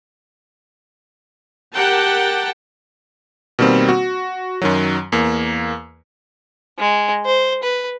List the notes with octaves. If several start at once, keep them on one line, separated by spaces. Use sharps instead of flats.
G4 A#4 F#5 G5 A5
B2 D#3 G3 A#3 C4
F#4
F#2 D#3 F#3
E2 A#3
G#3
C5
B4